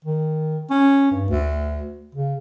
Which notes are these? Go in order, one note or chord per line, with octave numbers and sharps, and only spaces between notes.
D#3
C#4
G2
D2
C#3